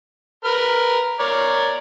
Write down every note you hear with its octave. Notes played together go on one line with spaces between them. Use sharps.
A#4 B4 F6
A#4 C#5 D5